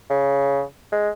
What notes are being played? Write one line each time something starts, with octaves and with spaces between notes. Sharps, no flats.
C#3
G#3